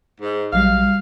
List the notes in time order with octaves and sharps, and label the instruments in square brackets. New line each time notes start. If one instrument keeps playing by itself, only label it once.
[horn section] G#2
[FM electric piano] A#1 F#3 G3 [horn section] F5